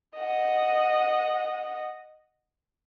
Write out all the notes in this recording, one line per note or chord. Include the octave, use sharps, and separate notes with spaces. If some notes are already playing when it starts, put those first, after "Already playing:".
D#5 F#5